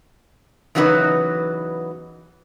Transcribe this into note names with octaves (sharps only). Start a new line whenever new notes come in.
C#3 E3 F#3 B3 D#4 B4